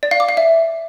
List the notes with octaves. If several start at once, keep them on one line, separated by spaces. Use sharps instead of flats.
D5
F5
D6
F5
E5